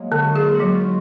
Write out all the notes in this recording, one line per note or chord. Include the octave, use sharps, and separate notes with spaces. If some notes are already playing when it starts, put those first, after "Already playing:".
Already playing: F#3 G#3 A#3
D3 F#4
D#4
F4 G#4
F#4
F#3
F4